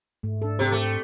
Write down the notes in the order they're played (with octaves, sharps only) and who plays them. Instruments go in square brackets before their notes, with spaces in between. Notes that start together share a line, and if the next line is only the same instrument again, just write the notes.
[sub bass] G#2 [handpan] A3
[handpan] D4 A4
[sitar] C3 [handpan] C4 G4 C5
[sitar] A3